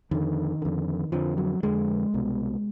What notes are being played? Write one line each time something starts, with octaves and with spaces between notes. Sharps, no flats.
F2 D3 D#3
F2 D3
F2 D3 F3
F#3
F2 D3 G#3
C2 B2